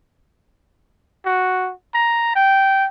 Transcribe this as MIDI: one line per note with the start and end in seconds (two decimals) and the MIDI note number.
1.25 1.72 66
1.94 2.32 82
2.35 2.88 79